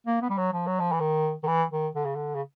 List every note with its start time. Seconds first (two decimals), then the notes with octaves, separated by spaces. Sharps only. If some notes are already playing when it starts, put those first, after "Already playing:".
0.07 A#3
0.22 B3
0.30 G3
0.38 F#3
0.53 F3
0.67 F#3
0.80 F3
0.92 E3
1.00 D#3
1.43 D#3
1.47 E3
1.71 D#3
1.95 D3
2.05 C#3
2.15 D3
2.35 C#3